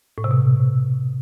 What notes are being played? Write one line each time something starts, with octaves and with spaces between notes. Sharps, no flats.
A2
C3
B2